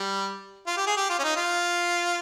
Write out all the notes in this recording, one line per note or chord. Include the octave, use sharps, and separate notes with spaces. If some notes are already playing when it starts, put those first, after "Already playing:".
Already playing: G3
F4
G4
G#4
G4
F4
C#4
D#4
F4